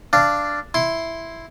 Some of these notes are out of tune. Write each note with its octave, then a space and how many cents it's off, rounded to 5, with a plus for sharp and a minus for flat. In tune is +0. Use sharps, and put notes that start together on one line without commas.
D4 +0 F5 -20
E4 +0 C6 +0